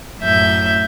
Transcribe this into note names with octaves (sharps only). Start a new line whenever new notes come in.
F#2 A2 E5 G6